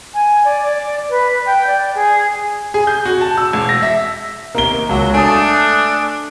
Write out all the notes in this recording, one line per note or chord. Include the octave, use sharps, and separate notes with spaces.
G#5
D5
D5
B4
G5
D5
G#4
G#4
G6
F#4
A5
E6
E1
A#6
E5
C3 D#3 A#3 G7
C#2 F#3
A3 D4 G#5 A5 D#6